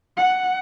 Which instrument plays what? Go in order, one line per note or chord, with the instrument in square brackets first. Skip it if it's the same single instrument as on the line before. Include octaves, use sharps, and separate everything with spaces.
[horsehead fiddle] F#5